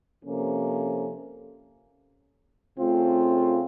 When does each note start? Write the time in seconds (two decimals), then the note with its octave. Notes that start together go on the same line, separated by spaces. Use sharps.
0.23 C3 F3 A#3 C#4 A4
2.77 C#3 A3 C4 F4